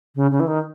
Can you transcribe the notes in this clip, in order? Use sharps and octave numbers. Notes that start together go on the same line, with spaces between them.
C#3
C#3
E3
D#3